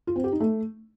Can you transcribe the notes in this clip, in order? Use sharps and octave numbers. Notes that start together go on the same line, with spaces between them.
F4
C4
G4
D#4
A3